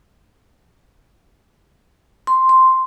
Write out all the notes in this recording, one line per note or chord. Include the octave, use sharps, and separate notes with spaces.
C6
C6